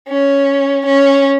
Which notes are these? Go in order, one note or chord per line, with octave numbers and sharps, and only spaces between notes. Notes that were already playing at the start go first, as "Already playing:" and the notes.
C#4
C#4